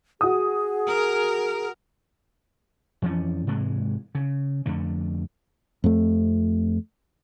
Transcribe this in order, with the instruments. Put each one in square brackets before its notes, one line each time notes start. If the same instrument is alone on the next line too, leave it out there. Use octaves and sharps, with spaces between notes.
[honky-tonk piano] F#4 D#6 [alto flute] G#4
[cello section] A#4
[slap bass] F2 E3 F3 C#4
G#2 C3 E3 G#3
C#3
F2 D3 A3
[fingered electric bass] F2 A3